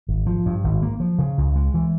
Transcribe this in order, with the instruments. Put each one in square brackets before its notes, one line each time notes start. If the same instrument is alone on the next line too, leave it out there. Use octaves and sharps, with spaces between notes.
[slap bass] G#1
F3
G2
G#1
A#3
F3
C#3
C#2
G#3
E3